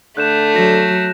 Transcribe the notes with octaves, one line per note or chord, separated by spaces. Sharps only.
D3 A3 F#6 G6 E7
F#3 A#6